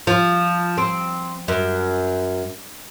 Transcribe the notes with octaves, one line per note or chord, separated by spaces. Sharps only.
F3
C4
F#2